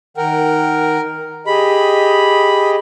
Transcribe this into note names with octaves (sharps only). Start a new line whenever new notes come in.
D#3 A#4 F#5 G5
G4 G#4 D#5 B5